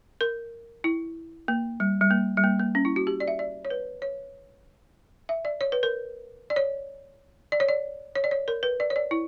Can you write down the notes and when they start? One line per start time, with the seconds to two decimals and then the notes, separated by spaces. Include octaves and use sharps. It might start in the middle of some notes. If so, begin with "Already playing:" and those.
0.21 A#4
0.84 E4
1.48 A#3
1.80 G3
2.01 G3
2.11 A#3
2.37 G3
2.44 A#3
2.60 A#3
2.75 C#4
2.85 E4
2.96 F#4
3.07 G4
3.20 D5
3.28 E5
3.39 D5
3.65 C#5
3.70 B4
4.02 C#5
5.29 E5
5.45 D5
5.61 C#5
5.72 B4
5.83 A#4
6.50 D5
6.56 C#5
7.52 D5
7.60 C#5
7.69 D5
8.15 C#5
8.24 D5
8.31 C#5
8.48 A#4
8.63 B4
8.80 D5
8.90 C#5
8.96 D5
9.11 E4